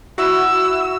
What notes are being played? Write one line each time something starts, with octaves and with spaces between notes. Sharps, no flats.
E4 F#4 E6